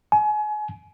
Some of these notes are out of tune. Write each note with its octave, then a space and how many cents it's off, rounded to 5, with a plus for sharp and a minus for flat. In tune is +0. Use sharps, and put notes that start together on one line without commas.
G#5 +30